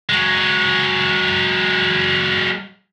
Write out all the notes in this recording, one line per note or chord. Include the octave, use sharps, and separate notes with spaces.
F#3 G#3